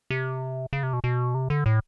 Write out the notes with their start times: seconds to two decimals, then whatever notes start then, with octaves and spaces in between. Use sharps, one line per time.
0.10 C3
0.73 C#3
0.83 C3
0.93 B2
1.04 B2
1.34 C3
1.50 D3
1.66 A2